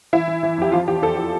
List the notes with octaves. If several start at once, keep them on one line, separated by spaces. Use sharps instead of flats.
E3 E4
E3
E3
F2 G4
F3 F4
E2 G4
E2 A4
G4